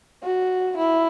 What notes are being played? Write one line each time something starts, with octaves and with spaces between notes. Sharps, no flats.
F#4
E4